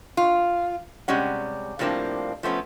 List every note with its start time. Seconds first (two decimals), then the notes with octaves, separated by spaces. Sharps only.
0.17 F4
1.08 C3 G3 G#3 C#4 F#5
1.79 A2 F3 G3 A#3 C4 D4
2.43 F3 A3 B3 C#4